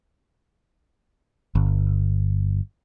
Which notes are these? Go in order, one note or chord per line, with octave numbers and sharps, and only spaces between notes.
G1